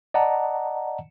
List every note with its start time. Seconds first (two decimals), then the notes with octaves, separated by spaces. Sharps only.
0.14 D5 D#5 F#5 A5 A#5